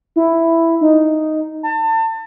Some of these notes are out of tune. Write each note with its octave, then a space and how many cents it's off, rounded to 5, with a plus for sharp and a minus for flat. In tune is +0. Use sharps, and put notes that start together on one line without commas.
E4 +5
D#4 +0
A5 +35